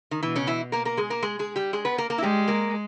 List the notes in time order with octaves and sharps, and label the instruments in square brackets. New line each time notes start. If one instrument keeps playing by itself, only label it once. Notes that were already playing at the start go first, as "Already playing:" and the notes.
[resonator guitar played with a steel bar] D#3
[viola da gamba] B2 [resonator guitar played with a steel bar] E3
[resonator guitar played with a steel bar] C#3 C#4
E3 E4
A#3 A#4
A#3 A#4
G#3 G#4
A#3 A#4
G#3 G#4
G#3 G#4
G3 G4
G#3 G#4
B3 B4
A#3 A#4
A#3 A#4
E4
[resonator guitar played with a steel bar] G3 G4 [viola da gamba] G#3
[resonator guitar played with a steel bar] A#3 A#4